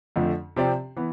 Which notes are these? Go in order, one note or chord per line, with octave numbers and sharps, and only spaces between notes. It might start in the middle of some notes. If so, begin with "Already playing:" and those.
F2 D3 F3 A3
C3 F3 C4 G4 D5
E3 B3